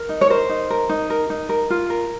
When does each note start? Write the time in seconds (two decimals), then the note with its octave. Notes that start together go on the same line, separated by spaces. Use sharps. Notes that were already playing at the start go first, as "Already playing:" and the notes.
Already playing: A#4
0.09 D#4
0.21 C#5
0.30 A#4 C5
0.49 D#4
0.70 A#4
0.89 D#4
1.10 A#4
1.30 D#4
1.49 A#4
1.70 F4
1.90 A#4